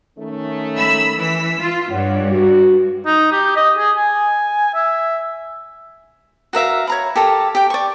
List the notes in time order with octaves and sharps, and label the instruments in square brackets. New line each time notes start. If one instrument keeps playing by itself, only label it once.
[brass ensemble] D#3 A3 C#4
[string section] B5 E6
E3 E6 B6
F4
[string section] G2 [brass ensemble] C#5 F#5
[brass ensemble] F#4
[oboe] D#4
G4
D#5
G#4
G#5
E5
[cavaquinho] F#4 A#4 E5 F5
C#5 A#5 B5
G4 A4 A#4
G4 G5
D5 C#6